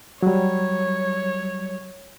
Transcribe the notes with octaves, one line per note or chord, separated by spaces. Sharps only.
F#3 G3 C#5